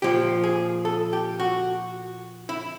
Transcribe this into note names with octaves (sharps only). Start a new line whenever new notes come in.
A#2 F3 G4
G#4
A4
G4
F#4
E4